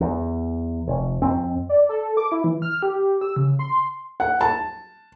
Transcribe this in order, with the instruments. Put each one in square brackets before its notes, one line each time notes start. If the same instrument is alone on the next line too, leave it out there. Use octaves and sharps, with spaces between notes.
[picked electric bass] E2
F1
F2 C4
[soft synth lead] D5
A4
D6
E4
E3
F6
G4
E6
C#3
C6
[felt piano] F#5
A5